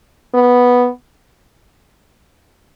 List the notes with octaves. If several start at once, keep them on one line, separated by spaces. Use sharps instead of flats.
B3